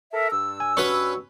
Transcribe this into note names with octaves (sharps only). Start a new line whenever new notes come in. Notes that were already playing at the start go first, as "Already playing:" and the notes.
A4 A#4 E5
G2 E6
G#5
C#4 F#4 B4 C#5 C#6